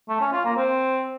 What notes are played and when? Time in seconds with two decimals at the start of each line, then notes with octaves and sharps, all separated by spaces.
0.09 A3
0.21 C#4
0.33 F4
0.45 A#3
0.57 C4